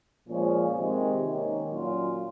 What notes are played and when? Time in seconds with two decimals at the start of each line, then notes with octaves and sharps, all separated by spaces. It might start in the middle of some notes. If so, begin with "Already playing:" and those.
0.28 A#2 F3 G#3 C#4
0.76 C3 D#3 G#3
1.25 D#3 A#3 C#4
1.72 A#2 F#3 C#4 F4